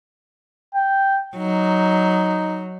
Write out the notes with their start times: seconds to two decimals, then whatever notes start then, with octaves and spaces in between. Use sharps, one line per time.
0.75 G5
1.37 F#3 D#4